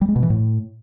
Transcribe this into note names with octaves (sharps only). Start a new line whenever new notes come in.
G3
G#3
B2
E3
A2